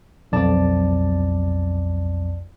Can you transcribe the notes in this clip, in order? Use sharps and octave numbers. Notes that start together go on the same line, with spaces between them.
B1 F2 D5 A5